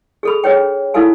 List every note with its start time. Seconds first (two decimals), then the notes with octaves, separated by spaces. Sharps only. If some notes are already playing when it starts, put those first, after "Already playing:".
0.23 G#4 A4 B5
0.44 D4 G#4 B4 C#5 G5
0.94 D#4 E4 A4 F5 G#5